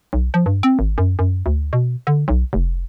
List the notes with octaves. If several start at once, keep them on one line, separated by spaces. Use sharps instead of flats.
B1
F3
G2
C4
G#1
F#2
F#2
D2
B2
D3
B1
F1